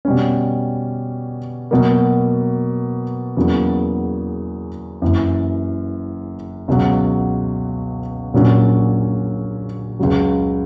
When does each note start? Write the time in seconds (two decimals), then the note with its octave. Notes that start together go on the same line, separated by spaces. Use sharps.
0.05 B2 G3 C#4
1.71 B2 F#3 A#3
3.37 E2 C#3 F#3 A#3
5.02 F#1 F#2 E3
6.68 C#2 B2 F#3
8.34 A#1 A#2 F#3 A#3 C#4
9.99 C#2 C#3 F#3